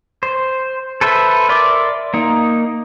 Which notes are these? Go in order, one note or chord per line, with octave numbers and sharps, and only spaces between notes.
C5
A4 B4 C5 E5
A#4 D5 E5 C6 D6
A#3 D#4